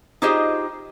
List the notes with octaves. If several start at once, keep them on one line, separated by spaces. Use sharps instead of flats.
D#4 F4 G4 G#4 C5 D#5